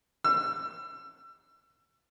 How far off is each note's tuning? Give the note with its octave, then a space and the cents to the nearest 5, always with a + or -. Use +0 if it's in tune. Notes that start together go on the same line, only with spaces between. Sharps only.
E6 +30